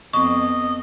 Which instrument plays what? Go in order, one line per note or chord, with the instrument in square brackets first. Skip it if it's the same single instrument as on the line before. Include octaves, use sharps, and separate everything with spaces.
[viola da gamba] F2 B3 [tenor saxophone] D#5 [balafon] C#6